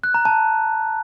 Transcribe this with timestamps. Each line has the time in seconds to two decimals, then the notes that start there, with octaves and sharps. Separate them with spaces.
0.04 F#6
0.14 A#5
0.25 A5